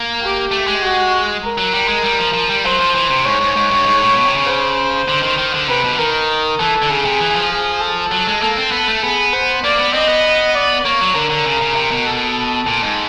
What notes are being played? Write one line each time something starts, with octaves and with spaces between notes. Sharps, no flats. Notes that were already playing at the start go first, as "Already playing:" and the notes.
Already playing: A#3
G4
A3
G#3
F#4
A#4
F#3
G3
G#3
G3
F3
F3
G3
F#3 C5
F3
E3
C3
G#2 C#5
G#2
G#2
G2
G#2
A2
B2
C3
C#3
C5
D3
D#3
D#3
D3
C3 B4
B2
D3
D#3 A#4
E3 A4
D3
C#3 G#4
C3
E3
F3
G#4
A4
F#3
G#3
A#3 A4
C4
B3
A3
B3 G#4
C5
A#3 D5
B3
C4 D#5
B3
D5
A#3 C#5
F#3
D3 A#4
D3
C#3
C#3
C3
B2
A4
A#2
G#2